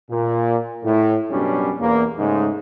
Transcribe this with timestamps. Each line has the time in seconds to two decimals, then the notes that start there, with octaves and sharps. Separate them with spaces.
0.11 A#2
0.85 A2
1.32 F#2 B2 G3 C#4 D4
1.80 E2 A#3
2.18 G#2 C#3 G#3 A3 D#4